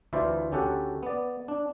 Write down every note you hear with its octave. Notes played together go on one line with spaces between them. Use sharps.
D2 E3 E4 F4 C5 D5
D2 C#4 G4 A4 F#5
B3 D5
D4